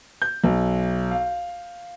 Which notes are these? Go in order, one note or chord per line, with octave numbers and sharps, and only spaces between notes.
G6
B1
F5